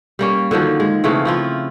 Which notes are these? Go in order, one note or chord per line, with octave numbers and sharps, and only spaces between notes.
G3 A#3 C#4
D3 D#3 F3 F#3
G#3
C#3 E3 A3 C4
F3 E4 F4